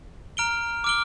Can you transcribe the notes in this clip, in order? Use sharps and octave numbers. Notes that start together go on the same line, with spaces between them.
A#5 F6 D7 G7
D6 F6 D7 G7